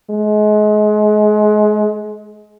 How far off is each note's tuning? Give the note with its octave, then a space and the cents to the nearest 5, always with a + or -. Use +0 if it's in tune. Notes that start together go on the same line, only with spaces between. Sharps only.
G#3 +30